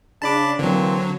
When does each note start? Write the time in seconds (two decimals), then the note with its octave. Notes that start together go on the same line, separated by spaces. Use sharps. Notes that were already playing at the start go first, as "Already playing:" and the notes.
0.22 C#3 D4 A5 B5 D6
0.59 D3 E3 F#3 A#3 C4